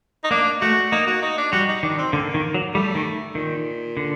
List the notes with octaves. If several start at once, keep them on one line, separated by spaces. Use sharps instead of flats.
D#4
A#3 D4
A3 F#4
A#3 D#4
F#4
D#4
D4
G3 F#4
D#4
D#3 D4
C4
D3 A#3
D#3
F#3
G3 A3
D#3
A#2 D#3
D3